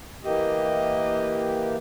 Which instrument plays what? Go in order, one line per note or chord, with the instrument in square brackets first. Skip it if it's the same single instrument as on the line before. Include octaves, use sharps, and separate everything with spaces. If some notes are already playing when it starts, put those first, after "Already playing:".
[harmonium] E3 A#3 G4 [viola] D#5